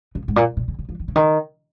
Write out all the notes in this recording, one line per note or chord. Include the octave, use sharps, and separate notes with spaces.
C#3
G#2
A#2
A#2
C#3
C#3
F3
D#3
C#3
D#3